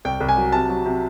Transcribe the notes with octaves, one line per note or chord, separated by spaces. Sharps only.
C2 G5
C2
G#5
F#3
C3 A5
F#3
C3